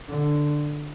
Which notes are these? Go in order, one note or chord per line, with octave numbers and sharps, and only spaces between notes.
D3